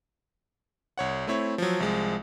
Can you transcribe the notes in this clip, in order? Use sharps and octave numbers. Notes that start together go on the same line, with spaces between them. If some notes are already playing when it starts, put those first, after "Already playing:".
C2 C#5 F#5
A3 C4 E4 C#5
F3 F#3
C2 F3 G#3